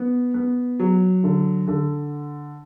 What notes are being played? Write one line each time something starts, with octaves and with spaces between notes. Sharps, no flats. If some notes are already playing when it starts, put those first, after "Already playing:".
Already playing: B3
B3
F#3
D3
D3